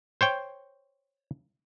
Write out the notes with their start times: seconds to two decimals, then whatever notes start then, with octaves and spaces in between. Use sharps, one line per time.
0.21 C5 C#5 G5